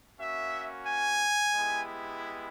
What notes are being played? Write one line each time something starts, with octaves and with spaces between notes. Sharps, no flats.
A#3 C#4 F#4 E5
G#5
G#3 B3 E4 G4